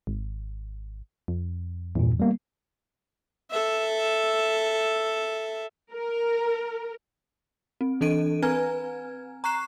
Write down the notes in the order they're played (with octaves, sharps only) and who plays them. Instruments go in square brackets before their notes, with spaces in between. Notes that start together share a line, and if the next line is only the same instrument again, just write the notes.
[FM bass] G#1
F2
[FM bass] E2 [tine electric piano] G2 A#2
[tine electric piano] G3 A#3 B3
[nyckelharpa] A4 E5
[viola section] A#4
[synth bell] C4
E3 D4 A4 D#5 D7 D#7
C4 B4 G#5 A#5 F6 G#6
A#5 C#6 F#6 C7 E7